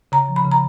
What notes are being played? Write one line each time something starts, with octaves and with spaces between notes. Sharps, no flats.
C#3 A#5
F3
B5
C#3
A#5